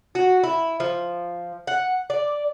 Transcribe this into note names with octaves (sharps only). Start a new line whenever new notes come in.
F#4
E4
F3
F#5
D5